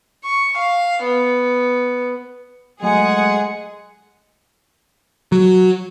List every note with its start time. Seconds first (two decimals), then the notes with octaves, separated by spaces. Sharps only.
0.22 C#6
0.56 F5
1.03 B3
2.82 F#3 G#3 A3 G#4 F#5 G#5
5.32 F#3